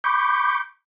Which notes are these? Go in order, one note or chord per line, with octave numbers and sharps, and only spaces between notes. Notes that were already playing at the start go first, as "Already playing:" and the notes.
B5 C#6 D6 G6